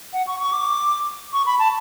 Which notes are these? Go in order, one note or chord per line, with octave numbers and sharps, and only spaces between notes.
F#5
C#6
C#6
D6
C#6
B5
A5